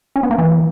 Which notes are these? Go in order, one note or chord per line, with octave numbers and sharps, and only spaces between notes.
C#4
B3
A#3
E3